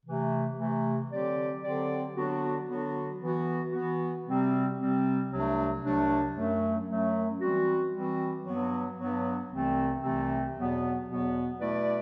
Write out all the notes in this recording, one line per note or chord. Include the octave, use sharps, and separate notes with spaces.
C3 E3 A3
C3 E3 A3
D3 F#3 C4 G4 D5
D3 F#3 C4 G4 D5
D3 F#3 B3 D4 F#4
D3 F#3 B3 D4 F#4
E3 B3 F#4
E3 B3 F#4
C3 G3 C4
C3 G3 C4
C2 C3 F#3 A3 D4
C2 C3 F#3 A3 D4
F#2 F#3 A3
F#2 F#3 A3
E3 G3 C4 F#4
E3 G3 C4 F#4
G2 F#3 B3
G2 F#3 B3
C2 C3 E3 A3 C4
C2 C3 E3 A3 C4
E2 B2 F#3 B3
E2 B2 F#3 B3
B2 A3 E4 B4 D5